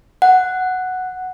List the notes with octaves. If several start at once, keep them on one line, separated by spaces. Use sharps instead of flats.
F#5